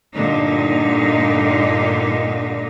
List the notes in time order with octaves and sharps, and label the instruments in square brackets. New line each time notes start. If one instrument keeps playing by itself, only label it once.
[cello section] G2 A#2 D3 D#4